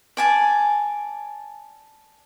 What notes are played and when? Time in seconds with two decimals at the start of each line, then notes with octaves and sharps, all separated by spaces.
0.17 D5 G#5 A5